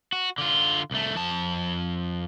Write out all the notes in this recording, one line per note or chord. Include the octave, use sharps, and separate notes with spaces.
F#4
D3 F4
C2 A3
F2 A5